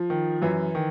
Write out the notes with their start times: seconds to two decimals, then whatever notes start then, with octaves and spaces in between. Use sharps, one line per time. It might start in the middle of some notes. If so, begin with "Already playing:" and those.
Already playing: F3
0.10 D#3
0.42 F#2 E3
0.75 D#3